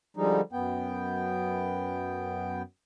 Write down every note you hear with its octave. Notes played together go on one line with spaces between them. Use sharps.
D3 F3 G3 G#3 D#4
F#2 B3 G5